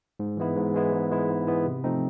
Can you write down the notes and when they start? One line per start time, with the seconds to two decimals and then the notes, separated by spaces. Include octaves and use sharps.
0.20 G#2
0.37 E3 G#3 B3 E4
0.56 G#2
0.74 E3 G#3 B3 E4
0.92 G#2
1.11 E3 G#3 B3 E4
1.29 G#2
1.47 E3 G#3 B3 E4
1.66 C3
1.84 F3 A3 C4 D#4